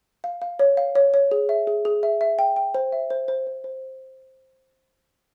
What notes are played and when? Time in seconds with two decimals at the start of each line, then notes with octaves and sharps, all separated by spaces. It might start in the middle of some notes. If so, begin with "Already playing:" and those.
0.24 F5
0.42 F5
0.59 C#5
0.77 F5
0.95 C#5
1.14 C#5
1.31 G#4
1.49 E5
1.67 G#4
1.85 G#4
2.03 E5
2.21 E5
2.39 G5
2.56 G5
2.74 C5
2.92 E5
3.10 C5
3.28 C5
3.47 C5
3.64 C5